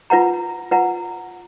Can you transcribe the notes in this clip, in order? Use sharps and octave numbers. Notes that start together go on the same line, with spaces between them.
F4 B4 F#5 A#5
F4 B4 F#5 A#5